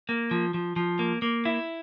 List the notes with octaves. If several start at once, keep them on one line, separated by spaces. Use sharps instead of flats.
A#3
F3
F3
F3
A#3
A#3
E4